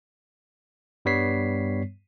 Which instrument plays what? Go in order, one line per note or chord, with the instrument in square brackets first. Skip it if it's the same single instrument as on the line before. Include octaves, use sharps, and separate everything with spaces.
[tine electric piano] G2 G3 B3 C#5 B6 C7